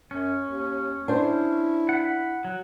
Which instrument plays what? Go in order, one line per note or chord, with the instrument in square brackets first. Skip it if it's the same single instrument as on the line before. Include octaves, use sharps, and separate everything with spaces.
[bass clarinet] F#2 [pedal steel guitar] C#4
[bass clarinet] D#2
[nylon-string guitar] D4 C5 [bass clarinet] E4
[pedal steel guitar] F#5 B5
F#3